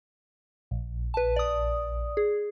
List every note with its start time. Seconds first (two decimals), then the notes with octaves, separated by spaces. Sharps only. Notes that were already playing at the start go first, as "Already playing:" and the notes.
0.71 A#1
1.14 B4 A5
1.36 D5 D#6
2.17 G#4